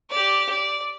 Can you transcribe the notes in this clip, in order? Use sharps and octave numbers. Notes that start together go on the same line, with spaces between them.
G4 D5
D5